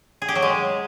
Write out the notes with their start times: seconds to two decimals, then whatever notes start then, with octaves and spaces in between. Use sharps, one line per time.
0.22 G#4
0.29 G4
0.35 F#3
0.42 G#3